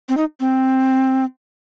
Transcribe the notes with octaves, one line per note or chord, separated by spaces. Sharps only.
C4
D#4
C4